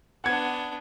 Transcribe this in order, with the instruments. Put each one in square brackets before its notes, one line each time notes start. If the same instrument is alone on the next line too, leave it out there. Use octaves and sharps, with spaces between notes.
[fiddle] B3 D4 [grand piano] F#5 G#6